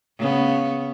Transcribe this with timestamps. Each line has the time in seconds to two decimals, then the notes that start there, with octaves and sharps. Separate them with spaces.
0.18 C#3 B3